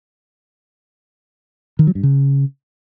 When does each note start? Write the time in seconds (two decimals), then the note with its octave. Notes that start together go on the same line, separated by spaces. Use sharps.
1.79 D#3
1.87 F#3
1.95 G2
2.03 C#3